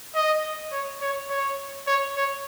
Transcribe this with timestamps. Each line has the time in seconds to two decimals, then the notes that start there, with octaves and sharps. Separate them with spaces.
0.15 D#5
0.72 C#5
1.01 C#5
1.30 C#5
1.87 C#5
2.16 C#5